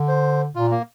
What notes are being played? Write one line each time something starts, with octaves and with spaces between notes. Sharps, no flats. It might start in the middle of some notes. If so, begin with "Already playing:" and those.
Already playing: D3
C5
A#2 F4
A#3